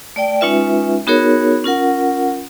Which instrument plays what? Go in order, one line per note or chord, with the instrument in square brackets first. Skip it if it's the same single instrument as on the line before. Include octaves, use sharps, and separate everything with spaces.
[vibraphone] A3 D5 G5
G#3 C#4 D#4 F4 B4 E5
B3 D#4 F#4 G#4 A#4 C#5
C#4 F4 A#4 F#5